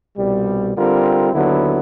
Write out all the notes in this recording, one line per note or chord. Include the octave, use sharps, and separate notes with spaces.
C2 B2 G3
D3 G3 C4 F4 A#4
D#2 D3 F#3 B3 E4